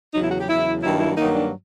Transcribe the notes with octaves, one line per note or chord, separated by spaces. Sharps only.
E2 C#3 F#3 D#4
E4
F#4
G4
E2 C#3 F#3 E4
G2 D#3 F#3 A#3 E4
E4
G2 D#3 F#3 A#3 D#4
D4